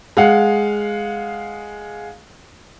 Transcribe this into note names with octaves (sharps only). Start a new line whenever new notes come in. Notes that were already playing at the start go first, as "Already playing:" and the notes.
G#3 F5 F#5